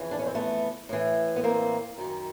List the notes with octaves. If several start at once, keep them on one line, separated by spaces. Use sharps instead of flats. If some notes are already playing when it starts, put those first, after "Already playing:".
Already playing: F2 C#3 E3
D4
C#4
C4
A3 B3
A2 E3
B3
A#3 C4
F#2 D#3